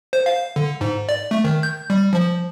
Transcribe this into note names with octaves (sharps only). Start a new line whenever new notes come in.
C5
F5
D3
G#2
D5
A3
D#3
G6
G3
F3